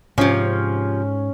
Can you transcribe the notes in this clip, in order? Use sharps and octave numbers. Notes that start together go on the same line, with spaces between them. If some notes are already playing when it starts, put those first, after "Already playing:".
G#2 C3 F3 C#4